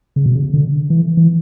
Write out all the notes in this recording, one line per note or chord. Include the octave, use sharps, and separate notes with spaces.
C#3
B2
C#3
D3
E3
E3